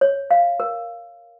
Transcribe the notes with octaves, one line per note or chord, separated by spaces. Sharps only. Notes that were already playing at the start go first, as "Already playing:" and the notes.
C#5
F5
A#4